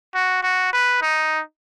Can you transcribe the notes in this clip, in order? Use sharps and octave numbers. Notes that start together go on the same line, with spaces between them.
F#4
F#4
B4
D#4